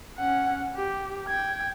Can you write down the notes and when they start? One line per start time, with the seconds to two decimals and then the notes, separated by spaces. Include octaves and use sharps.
0.18 C#4 F#5
0.75 G4
1.27 G5 G#6